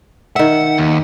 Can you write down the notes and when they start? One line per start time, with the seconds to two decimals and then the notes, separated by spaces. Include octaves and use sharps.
0.36 D#3 E5 F#5
0.78 D#2